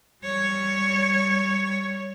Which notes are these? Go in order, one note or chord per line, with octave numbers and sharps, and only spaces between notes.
G3 C#5